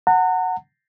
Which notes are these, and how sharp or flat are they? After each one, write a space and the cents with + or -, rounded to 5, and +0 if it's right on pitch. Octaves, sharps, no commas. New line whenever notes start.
F#5 +0 A#5 -40